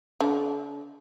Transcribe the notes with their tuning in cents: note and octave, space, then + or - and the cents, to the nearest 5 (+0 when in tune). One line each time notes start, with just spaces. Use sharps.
D3 -45